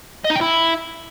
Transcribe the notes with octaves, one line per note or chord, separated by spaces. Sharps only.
D#5
D#4
G5
E4